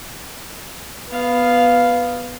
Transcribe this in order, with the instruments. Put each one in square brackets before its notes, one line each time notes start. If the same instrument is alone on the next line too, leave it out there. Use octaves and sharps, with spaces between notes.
[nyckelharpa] B3 F5